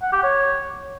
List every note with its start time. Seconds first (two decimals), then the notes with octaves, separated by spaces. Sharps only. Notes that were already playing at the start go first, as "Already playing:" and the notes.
0.02 F#5
0.13 G4
0.24 C#5